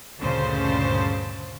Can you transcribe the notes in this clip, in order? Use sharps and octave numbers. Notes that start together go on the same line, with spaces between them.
D2 G2 A#2 C#3 C5 A5